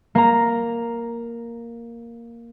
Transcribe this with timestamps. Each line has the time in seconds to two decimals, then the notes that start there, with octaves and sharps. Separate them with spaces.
0.15 A#3 A#5